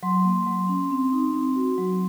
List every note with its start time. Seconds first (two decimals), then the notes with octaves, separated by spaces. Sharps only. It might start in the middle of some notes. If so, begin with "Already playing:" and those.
0.03 F#3 C6
0.25 A#3
0.46 F#3
0.68 C#4
0.90 C4
1.12 D#4
1.34 C4
1.56 F#4
1.78 F#3